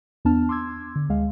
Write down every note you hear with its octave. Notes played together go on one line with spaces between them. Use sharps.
E2 B3 D4 A5 F6
C6 D6 E6 G#6
D3
D2 G#3 F5